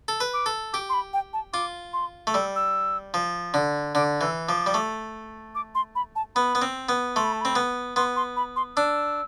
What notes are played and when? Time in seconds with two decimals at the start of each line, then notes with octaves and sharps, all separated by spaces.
0.08 A4
0.20 B4
0.34 D6
0.46 A4
0.73 G4 D6
0.89 C6
0.93 B5
1.13 G5
1.33 A5
1.53 F4 D6
1.93 C6
2.27 A3
2.34 G3 E6
2.56 E6
3.14 F3
3.54 D3
3.95 D3 D6
4.21 E3 E6
4.47 F3 D6
4.66 G3
4.74 A3
5.55 D6
5.75 C6
5.95 B5
6.16 A5
6.36 B3 B5
6.55 B3
6.62 C4
6.89 B3
7.16 A3 C6
7.24 B5
7.33 A5
7.41 C4 B5
7.55 B3
7.96 B3 C6
8.16 C6
8.36 B5
8.56 C6
8.76 D4 E6